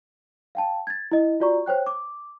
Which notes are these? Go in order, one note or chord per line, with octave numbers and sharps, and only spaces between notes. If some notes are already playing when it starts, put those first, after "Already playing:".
F5 G5 A5
G#6 A6
E4 D#5
F4 F#4 D5 A#5 C#6
C5 C#5 G5 F#6
D6